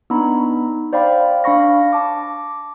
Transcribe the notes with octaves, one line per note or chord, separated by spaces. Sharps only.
B3 D4 D#4 A#5 B5
C5 D5 F5 G5 B5
D4 F5 B5 C#6 A#6
A5 D6